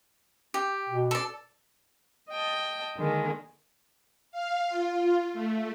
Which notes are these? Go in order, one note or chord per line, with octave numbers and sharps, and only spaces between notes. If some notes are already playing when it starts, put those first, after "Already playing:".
G4
B2
A4 D5
D#5 G5 A5
D3 D#3 G#3 A#3
F5
F4
A3